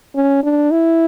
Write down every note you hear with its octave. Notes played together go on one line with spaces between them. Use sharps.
C#4
D4
E4